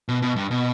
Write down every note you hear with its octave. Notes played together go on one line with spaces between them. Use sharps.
B2
B2
G2
B2